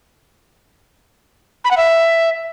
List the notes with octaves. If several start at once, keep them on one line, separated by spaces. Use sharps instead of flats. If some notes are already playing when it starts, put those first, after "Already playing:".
B5
F#5
E5